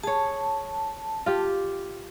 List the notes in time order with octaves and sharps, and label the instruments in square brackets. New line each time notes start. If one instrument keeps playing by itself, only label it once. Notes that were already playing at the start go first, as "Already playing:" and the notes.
[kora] G#4 C#5 [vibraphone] A5
[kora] F4 G4